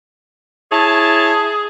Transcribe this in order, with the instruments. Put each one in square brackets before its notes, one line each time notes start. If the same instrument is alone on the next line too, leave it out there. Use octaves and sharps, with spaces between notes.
[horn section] E4 C#5 A5 [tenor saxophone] G#4